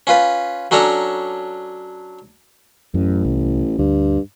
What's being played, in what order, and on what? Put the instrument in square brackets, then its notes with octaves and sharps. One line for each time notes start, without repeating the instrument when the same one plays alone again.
[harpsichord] C#4 F4 B4
F#3 C#4 D4 A4 A#5
[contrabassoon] A1 [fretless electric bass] F#2
[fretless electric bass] C2
[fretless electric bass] D2 [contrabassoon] G2